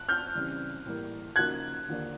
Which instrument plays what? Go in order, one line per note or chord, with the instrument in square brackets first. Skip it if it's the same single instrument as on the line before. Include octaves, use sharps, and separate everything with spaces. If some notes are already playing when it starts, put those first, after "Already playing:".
Already playing: [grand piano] F#6
F6 G6
[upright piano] C#3 E3 G3 C4
A2 E3 G3 A#3
[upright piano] C#3 F3 A#3 D#4 F#4 [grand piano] F#6 G#6
[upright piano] D#2 D3 F3 A#3 D4